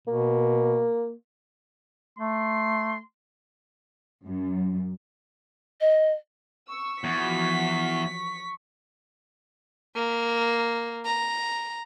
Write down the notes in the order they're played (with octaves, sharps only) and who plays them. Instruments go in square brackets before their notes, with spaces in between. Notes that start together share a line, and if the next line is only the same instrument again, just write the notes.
[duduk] B2 [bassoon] A#3
[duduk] A3 [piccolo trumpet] C6
[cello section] F#2
[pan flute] D#5
[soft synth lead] C#6 [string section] E6
[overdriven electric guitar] E2 [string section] E3 F3 F#4 [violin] B6
[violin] A#3
A#5